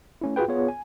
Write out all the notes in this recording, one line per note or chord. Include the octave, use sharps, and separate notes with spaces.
A3 C#4 E4
F4 F#4 G#4 B4 G5
B3 F4 G#4 C#5
G#5